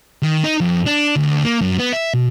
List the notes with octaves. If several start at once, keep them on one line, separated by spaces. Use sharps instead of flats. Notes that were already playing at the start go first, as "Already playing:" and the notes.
D#3
D#4
F2
D4
D2
A#3
F#2
B3
E5
B2